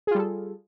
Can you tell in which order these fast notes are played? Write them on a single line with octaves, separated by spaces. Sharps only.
G#4 F4 G3 A4